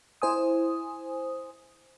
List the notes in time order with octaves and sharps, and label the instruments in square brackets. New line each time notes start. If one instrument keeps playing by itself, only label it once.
[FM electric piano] E4 C5 G#5 D#6